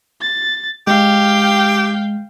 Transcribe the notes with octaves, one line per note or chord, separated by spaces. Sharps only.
A6
G#3 G4 F5 G5